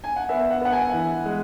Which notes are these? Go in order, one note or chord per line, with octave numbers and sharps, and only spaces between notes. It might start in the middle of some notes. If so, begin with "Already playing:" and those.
G#5
F#5
B3 E5
F#5
B3 F#5
G#5
E3
G#3